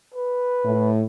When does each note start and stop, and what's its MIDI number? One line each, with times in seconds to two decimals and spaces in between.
0.14 0.90 71
0.65 1.03 45